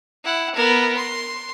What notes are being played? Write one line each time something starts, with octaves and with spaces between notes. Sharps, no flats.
E4 F#5
B3 A#4
C6